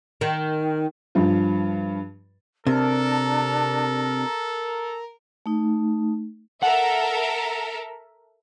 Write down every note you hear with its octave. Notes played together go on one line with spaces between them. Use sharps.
D#3
G2 F3
C3 D4 A4 A#4
A3 D#4
A4 A#4 E5 F#5